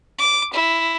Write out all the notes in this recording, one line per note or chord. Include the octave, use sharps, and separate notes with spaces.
D6
E4